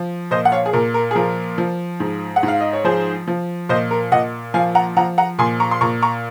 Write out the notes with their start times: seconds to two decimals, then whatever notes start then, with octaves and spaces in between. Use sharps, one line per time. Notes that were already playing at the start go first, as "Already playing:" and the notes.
Already playing: F3
0.31 A#2 C5 D#5
0.45 F#5
0.52 C#5 F5
0.66 G#4
0.73 A#2 A#4
0.94 A#4
1.11 G#4
1.15 F3 A#4
1.58 F3
2.00 G#2
2.36 F#5
2.43 G#2
2.48 F5
2.60 D#5
2.73 C#5
2.84 F3 G#4 C5
3.28 F3
3.69 A#2 C5 D#5
3.91 A#4
4.12 A#2 D#5 F#5
4.54 F3 F5 G#5
4.75 F#5 A#5
4.96 F3 F#5 A#5
5.18 F#5 A#5
5.38 A#2 G#5 C6
5.60 A#5 C#6
5.71 C6
5.81 A#2 A#5 C#6
6.02 A#5 C#6